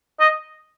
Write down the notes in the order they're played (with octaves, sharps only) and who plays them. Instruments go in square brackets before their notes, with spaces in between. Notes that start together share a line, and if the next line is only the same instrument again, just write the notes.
[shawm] D#5